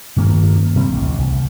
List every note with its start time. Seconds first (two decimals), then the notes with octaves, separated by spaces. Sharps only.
0.16 G2 D#3 A#3 C#4
0.75 C3 G3 C4
0.92 A1 D2
1.18 C2